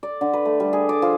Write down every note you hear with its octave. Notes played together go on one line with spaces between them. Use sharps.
D5
D3
B4
A3
G3
G#4
D5
F3